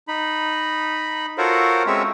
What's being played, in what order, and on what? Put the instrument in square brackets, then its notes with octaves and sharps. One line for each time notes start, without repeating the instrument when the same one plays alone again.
[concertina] D#4 B5
F4 F#4 A4 A#4 C5 C#5
G#3 C4 C#4 C#5 E5